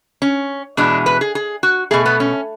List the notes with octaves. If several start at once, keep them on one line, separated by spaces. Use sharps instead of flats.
C#4
E2 B2 G#3 D4
B4
G#4
G#4
F#4
B2 A3 G#4
B3
C#4